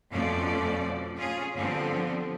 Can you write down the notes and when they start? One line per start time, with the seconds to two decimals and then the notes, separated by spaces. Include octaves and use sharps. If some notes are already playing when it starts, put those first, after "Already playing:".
0.10 F2 B2 F3 A3 C#4 D5
1.16 C#4 F4 G#4
1.55 D3 F3 G3 B3 C4